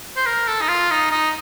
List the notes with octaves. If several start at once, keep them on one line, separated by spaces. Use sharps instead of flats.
C5
A#4
A4
D#4
F4
D#4
D#4